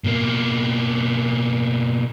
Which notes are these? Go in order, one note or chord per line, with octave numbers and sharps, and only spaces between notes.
B2 A#3